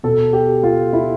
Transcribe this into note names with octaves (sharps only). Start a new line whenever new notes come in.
B2 A4
G4
F4
E4